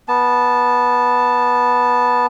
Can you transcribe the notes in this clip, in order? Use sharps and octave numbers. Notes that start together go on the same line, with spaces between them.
B3 A5